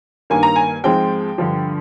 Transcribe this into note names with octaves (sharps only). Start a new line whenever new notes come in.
G2 D#3 A#3 G#5
A#5
G#5
G#2 F3 G#3 C4 G5
G2 D3 F3